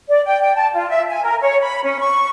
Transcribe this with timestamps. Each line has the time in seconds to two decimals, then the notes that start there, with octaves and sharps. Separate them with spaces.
0.08 D5
0.24 G5
0.42 G5
0.55 A5
0.74 F4
0.89 E5
1.09 G#5
1.23 A#4
1.40 C#5
1.61 B5
1.84 C#4
1.99 C#6